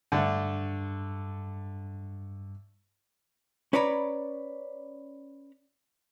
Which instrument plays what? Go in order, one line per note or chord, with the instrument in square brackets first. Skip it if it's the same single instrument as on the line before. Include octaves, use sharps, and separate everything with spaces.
[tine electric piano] G2 [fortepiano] D3 A3
[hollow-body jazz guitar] C#4 B4 C#5 D5 A#5 B5